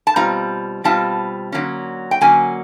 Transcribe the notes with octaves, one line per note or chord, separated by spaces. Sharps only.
A5
B2 G3 C4 F4 A#5
B2 G3 C4 F4 A5
D3 F#3 A#3 C#4
G5
D3 F#3 A#3 C#4 G#5